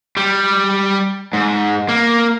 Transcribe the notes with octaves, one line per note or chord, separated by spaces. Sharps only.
G3
G#2
A#3